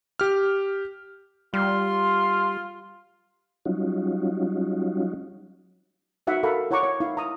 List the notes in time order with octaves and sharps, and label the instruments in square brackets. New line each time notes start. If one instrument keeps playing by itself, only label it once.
[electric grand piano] G4 F6
[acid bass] G3 [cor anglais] F4 [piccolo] C6 [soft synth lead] F6
[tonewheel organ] F#3 G3 C#4 D#4 F4 F#4
[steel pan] D#4 F#4 E5 F#5
A4 A#4 F5 F#5 A#5 B5
E4 C#5 F#5 A#5 C#6 D6
C#5
D#4 E4 F5
A#5 D#6